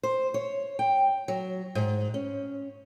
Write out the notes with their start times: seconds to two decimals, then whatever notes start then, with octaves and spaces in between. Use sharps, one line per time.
0.03 C5
0.34 C#5
0.79 G5
1.28 F#3
1.75 G#2
2.14 C#4